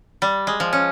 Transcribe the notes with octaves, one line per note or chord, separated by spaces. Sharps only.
G3
G#3
F3
C#4